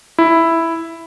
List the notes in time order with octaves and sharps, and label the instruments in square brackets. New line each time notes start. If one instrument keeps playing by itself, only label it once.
[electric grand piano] E4